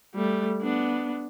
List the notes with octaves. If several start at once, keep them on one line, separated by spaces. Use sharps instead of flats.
G3 A3
B3 D4